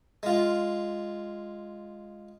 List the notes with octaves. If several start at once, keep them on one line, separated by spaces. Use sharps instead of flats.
G#3 F4